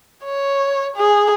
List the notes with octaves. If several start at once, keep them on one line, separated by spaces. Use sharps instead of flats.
C#5
G#4